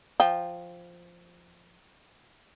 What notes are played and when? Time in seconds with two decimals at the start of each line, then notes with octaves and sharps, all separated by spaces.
0.20 F3 G5